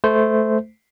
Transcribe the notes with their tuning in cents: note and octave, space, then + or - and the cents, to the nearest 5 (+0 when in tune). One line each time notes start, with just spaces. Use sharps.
A3 -15 C5 -20